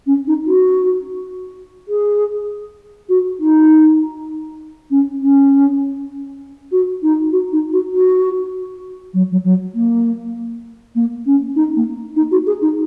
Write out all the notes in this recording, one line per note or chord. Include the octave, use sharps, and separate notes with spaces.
C#4
D#4
F#4
G#4
F#4
D#4
C#4
C#4
F#4
D#4
F#4
D#4
F#4
F#4
F#3
F#3
F#3
A#3
A#3
C#4
D#4
A#3
D#4
F#4
G#4
D#4